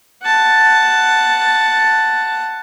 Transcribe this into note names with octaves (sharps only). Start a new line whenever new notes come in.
F#5 A5